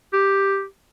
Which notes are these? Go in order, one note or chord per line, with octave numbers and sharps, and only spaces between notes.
G4